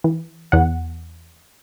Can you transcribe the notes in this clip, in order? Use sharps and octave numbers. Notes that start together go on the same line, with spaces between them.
E3
E2 F#5